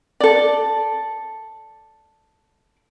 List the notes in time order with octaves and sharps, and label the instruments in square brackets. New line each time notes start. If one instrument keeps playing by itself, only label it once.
[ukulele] A4 D5